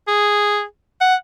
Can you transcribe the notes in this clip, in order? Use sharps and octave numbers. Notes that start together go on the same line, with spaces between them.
G#4
F#5